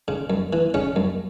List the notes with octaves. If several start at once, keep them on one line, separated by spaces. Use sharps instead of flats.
C#3
F#2
E3
C#3 C#4
F#2